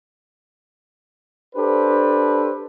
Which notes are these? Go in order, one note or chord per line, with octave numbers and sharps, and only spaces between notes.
D4 G4 A4 B4 C5